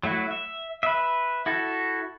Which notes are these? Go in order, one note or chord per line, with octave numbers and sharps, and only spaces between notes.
F#3 A3 E4 F#4
E5
B4 E5
E4 F#4 A4